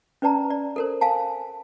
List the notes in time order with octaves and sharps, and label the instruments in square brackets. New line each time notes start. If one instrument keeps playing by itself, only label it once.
[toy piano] C#4 B4 D5 A5 A#5
D5
A4 A#4 C5
F5 G#5 A5